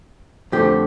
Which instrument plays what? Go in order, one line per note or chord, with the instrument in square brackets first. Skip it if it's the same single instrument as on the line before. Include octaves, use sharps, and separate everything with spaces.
[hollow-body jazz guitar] F2 D3 A3 G4